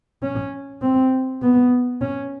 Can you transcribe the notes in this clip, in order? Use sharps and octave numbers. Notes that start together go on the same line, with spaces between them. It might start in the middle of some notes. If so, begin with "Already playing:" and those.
C#4
C4
B3
C#4